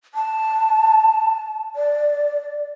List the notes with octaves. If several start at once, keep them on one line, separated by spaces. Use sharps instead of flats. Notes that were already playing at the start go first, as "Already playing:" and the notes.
A5
D5